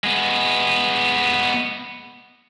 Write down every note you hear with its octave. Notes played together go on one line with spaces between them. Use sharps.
G#3 B3